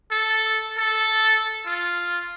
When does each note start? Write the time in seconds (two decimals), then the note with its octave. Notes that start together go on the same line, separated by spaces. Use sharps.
0.11 A4
0.78 A4
1.66 F4